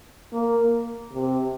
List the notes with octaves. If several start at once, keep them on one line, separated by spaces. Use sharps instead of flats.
A#3
C3